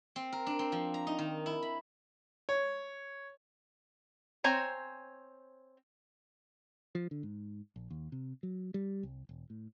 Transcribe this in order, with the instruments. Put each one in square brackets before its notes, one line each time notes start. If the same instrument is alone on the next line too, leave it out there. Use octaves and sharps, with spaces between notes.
[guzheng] C4
A#4
D4
C4
F3
A#5
D#4
D#3
E4
B5
[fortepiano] C#5
[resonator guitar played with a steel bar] C4 C5 C#5 G#5 A#5
[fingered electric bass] F3
D3
G#2
A#1
D#2
C3
F#3
G3
C2
E1
A2